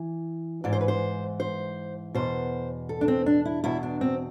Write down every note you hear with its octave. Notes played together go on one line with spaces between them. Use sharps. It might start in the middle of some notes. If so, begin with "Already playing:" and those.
Already playing: E3
G#2 E3 D5
C5
B4
C5
C5
E2 B2 C5
A4
D4
C4
D4
E4
E2 B2 E4
D4
C4